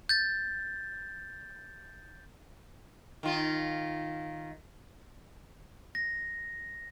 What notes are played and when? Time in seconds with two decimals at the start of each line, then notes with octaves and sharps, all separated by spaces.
0.09 G6 A6
3.23 D#3 F4
5.95 A#6